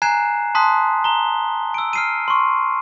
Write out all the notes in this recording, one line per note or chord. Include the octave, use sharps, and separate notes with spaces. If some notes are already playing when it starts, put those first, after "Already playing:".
G#5 A#5 F#6 G#6 C7 E7
A5 C6 D#6 F#6 B6
A#5 G7
E6 D7
F6 C7 D#7
C6 C#6